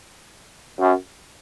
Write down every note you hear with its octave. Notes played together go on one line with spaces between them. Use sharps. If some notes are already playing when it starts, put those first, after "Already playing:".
F#2